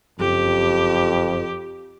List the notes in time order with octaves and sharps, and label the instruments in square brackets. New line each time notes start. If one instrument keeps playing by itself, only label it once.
[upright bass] F#1 [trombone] F2 [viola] G4